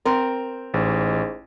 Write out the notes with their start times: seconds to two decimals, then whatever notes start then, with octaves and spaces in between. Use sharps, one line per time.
0.05 C4 A#4
0.74 A1 G#2